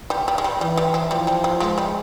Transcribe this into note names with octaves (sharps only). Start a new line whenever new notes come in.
G3
G3
G#3
G3
E3 G3
G3
F3
F3 G3
G3
G3
F3 G#3
G3